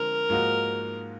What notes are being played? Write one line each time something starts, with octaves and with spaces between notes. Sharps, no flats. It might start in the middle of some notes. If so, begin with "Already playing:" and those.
Already playing: D3 F3 G#3 C4 A#4
G#2 F3 A#3 D#4 F#4